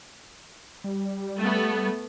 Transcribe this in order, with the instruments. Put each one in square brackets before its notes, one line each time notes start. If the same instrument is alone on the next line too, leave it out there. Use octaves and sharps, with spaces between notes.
[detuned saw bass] G3
[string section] A3 B3